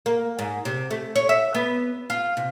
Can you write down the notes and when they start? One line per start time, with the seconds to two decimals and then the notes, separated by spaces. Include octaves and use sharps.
0.06 A#3
0.39 G#2
0.65 C3
0.91 A3
1.16 C#5
1.29 E5
1.55 B3
2.10 F4
2.37 C3